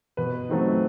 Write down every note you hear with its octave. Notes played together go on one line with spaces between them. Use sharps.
B2 B4
F#3 A3 C4 D#4